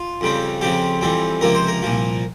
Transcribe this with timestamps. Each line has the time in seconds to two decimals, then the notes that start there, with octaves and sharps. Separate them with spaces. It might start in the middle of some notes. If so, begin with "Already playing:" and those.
Already playing: F4
0.21 F2 C#3 G3 C4
0.61 F2 C#3 F3 C4 G4
1.01 F2 E3 G3 C4
1.41 C#2 C3 F3 A#3 A#4
1.55 C5
1.67 A#4
1.82 C2 A#2 F3